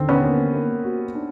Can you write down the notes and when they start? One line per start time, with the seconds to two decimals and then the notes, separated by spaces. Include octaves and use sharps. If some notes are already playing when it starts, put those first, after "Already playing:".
Already playing: D#2 D3 C4
0.09 B3 C#4
0.23 A#3
0.54 A#3
0.84 F#4
1.15 D4